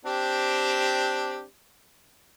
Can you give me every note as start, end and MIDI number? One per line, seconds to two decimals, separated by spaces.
0.05 1.44 60
0.05 1.44 62
0.05 1.44 67